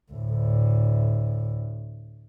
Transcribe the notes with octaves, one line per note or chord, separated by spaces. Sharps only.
D2 A2